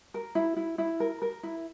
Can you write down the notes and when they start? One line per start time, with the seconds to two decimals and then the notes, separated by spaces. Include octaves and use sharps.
0.14 A#4
0.35 E4
0.57 E4
0.78 E4
1.00 A#4
1.22 A#4
1.43 E4